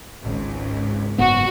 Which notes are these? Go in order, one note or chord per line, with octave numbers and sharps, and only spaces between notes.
G#1 C#2
F#1 G#2 B3 F#4